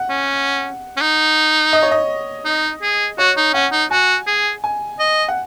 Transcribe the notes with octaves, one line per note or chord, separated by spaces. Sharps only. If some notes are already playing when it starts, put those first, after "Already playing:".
Already playing: F#5
C#4
C#4
D#4
D#5
C#5
D#5
D#4
G#4
F#4 C#5
D#4
C#4 F#5
D#4
F#4 G#5
G#4
G#5
D#5
F#5